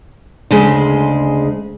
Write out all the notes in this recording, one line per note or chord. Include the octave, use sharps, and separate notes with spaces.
D2 C#3 G#3